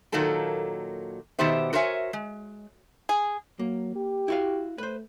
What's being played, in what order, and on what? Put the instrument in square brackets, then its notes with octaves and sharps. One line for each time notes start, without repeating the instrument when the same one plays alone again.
[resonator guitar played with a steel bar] A#2 D#3 F#3 A#3 A4 A5
B2 D#3 B3 G4 C5 E5
F#4 A#4 C5 C#5 E5 G#5
G#3
[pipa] G#4
[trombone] F#3 [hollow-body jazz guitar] A#3
[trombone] G4
[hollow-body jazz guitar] E4 F#4 F5
[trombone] A3 [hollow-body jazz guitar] B4 C5